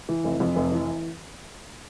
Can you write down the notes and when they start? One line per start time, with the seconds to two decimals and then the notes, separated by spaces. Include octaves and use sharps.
0.09 E3
0.24 F1
0.40 F2
0.56 F1
0.72 E3